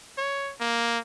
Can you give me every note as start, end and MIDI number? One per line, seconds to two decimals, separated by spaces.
0.18 0.52 73
0.61 0.99 58